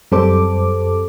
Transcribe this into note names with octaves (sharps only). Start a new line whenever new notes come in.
F#2 G3 C4 A4 C5 D6